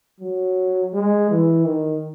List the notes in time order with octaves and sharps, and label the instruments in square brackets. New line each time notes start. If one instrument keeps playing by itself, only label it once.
[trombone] F#3
G#3
E3
D#3